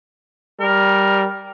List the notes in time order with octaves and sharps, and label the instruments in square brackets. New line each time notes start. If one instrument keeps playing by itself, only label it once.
[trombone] G3 [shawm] A#4